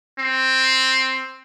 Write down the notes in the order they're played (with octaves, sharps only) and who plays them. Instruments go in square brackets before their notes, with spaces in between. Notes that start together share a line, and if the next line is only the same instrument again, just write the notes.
[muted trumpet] C4